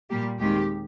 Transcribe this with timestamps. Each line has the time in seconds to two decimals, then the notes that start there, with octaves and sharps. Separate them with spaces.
0.10 A#2 G3 A#3 G4
0.40 D#2 D#3 G#3 C4 G4